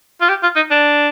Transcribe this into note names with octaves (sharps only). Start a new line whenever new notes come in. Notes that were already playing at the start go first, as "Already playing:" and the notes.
F4
G4
F4
D#4
D4